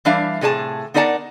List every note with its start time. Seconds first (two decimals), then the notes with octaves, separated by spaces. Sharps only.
0.05 E3 G3 D4 E5 F5
0.41 A2 C3 G#4 C#5 A5
0.94 B3 D#4 A#4 D5 F#5 A5